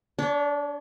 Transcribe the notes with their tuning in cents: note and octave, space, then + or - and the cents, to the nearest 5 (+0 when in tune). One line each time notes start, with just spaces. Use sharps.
D4 -20 C#5 +25